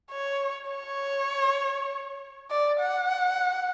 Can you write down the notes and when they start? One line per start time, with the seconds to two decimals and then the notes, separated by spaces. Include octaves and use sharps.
0.11 C#5
0.71 C#5
2.51 D5
2.81 F#5